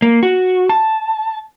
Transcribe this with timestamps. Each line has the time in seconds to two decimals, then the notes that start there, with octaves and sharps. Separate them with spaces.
0.02 A#3
0.23 F#4
0.69 A5